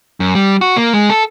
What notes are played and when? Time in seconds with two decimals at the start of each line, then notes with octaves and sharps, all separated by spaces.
0.20 F#2
0.35 G3
0.61 F#4
0.77 A#3
0.93 G#3
1.10 A4